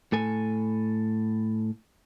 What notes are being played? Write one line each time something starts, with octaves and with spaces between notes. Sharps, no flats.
A2 A4 G#5